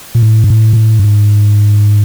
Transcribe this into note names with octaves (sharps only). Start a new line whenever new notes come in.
A#2
A2
G#2
A2
A#2
A2
G2
G#2